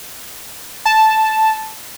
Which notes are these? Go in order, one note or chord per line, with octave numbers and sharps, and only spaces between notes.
A5